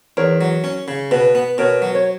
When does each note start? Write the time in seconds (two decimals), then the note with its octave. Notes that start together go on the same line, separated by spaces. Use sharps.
0.17 E2 A#4 C#5
0.41 F#3
0.64 C#4
0.88 C#3
1.11 B2 B4
1.35 B3
1.58 B2 A#4 C#5
1.82 F#3
1.95 C#5